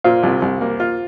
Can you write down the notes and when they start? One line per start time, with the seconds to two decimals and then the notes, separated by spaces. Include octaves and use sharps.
0.04 A#2 C5 F5
0.23 C2
0.42 C2
0.61 A#3
0.80 F4